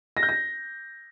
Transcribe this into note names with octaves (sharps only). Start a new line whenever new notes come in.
A#6
G6
A#6